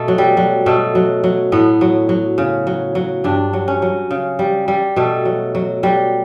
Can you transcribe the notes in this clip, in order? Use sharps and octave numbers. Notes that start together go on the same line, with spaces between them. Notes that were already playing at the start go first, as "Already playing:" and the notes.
Already playing: B2 A3
F#3
G3
F#3
B2 A3
F#3
F#3
A2 B3
F#3
F#3
C#3
F#3
F#3
G2 D4
F#3
C#4
F#3
C#3
G3
G3
B2 A3
F#3
F#3
F#3 G3